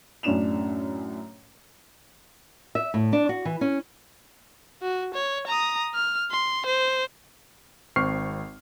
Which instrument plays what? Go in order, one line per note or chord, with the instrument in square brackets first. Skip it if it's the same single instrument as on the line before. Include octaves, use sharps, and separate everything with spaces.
[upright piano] F#2 A2 C#4 D4 E7 F7
[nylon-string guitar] E5
A2
D4
F#4
E3
C#4
[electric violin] F#4
C#5
A#5 D#6
F6
C6
C5
[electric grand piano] G#1 C4 C5 C#6 F6 C7